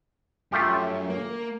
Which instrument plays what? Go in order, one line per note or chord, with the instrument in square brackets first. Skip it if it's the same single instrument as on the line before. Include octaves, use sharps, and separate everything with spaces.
[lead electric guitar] F#2 [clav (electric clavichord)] A3 F4 G4
[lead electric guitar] A#3